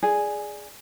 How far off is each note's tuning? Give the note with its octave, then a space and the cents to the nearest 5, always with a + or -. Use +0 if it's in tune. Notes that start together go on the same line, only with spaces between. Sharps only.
G#4 +0 D5 +0